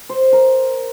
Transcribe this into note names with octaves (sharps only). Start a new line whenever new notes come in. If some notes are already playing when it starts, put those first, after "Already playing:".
C5
A#4